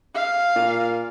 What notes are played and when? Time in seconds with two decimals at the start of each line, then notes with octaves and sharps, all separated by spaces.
0.15 F5
0.56 A#2